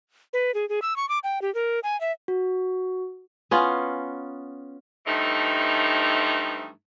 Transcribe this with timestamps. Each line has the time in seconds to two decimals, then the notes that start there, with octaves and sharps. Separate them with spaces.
0.33 B4
0.54 G#4
0.69 G#4
0.82 E6
0.96 C#6
1.09 D6
1.24 G5
1.42 G4
1.55 A#4
1.83 G#5
2.01 E5
2.28 F#4
3.51 B3 C#4 F4
5.06 G2 E3 F3 A3 D#4